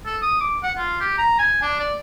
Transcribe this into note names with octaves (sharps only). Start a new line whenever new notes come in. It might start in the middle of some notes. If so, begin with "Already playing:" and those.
A4
D#6
D6
F#5
F4
G4
A#5
G#5
D4
D5